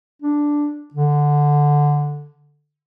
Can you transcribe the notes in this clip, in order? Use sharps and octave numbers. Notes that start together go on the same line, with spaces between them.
D4
D3